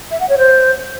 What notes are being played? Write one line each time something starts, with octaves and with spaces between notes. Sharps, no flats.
E5
F#5
C#5
C5